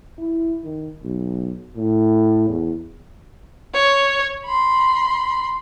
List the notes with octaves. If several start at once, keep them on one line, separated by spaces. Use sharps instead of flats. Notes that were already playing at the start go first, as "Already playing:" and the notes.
E4
D#3
B1
A2
E2
C#5
B5 C6